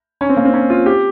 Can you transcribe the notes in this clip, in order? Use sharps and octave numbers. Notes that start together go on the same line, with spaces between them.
C#4
C4
A#3
C4
C#4
F4
G4